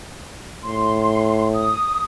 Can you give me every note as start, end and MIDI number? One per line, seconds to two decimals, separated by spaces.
0.64 1.73 45
0.64 1.47 84
1.54 2.02 87